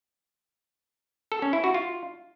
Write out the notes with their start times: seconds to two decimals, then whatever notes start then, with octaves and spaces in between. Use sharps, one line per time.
1.32 A4
1.42 C#4
1.53 E4
1.64 F#4
1.74 F4